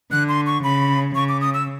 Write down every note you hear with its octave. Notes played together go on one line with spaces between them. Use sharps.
D3 F#6
C6
C#6
C#3 B5
C#3 C#6
D6
D#6
E6